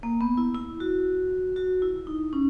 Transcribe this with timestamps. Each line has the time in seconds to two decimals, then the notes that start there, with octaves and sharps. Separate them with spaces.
0.03 A#3
0.21 B3
0.38 E4
0.55 E4
0.80 F#4
1.56 F#4
1.82 E4
2.07 D#4
2.33 C#4